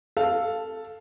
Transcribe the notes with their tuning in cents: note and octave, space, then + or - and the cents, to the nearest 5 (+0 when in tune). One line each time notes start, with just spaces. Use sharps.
A4 +0 F5 +0